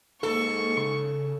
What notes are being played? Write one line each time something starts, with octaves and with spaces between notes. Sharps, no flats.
G#2 A#3 A4 C#6
C#3